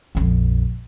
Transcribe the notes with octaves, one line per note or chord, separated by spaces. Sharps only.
A#1 F2